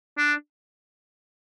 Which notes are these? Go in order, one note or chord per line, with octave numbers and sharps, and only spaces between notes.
D4